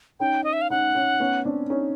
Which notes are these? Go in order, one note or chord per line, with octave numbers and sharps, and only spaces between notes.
C#4 D#4 G5
D#5
E5
F5
C#4 D#4 F#5
C#4 D#4
B3 C#4
C4 D4
C#4 D#4